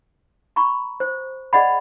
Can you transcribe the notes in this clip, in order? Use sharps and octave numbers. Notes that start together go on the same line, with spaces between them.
A#5 B5 C#6
C5
G#4 D5 D#5 F#5 B5